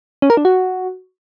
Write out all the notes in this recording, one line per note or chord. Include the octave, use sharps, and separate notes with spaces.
C#4
A#4
D4
F#4